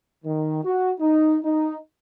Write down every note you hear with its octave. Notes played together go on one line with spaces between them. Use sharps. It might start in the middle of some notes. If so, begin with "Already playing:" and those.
D#3
F#4
D#4
D#4